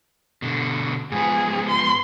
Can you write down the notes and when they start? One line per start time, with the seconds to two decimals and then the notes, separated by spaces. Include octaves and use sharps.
0.42 B2 D3
1.12 G#2 F3 B3 G#4
1.68 C6